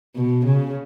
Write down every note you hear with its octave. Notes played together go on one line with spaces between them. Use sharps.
B2
C#3